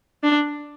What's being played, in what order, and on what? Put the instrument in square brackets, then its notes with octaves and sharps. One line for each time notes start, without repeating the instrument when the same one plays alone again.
[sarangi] D4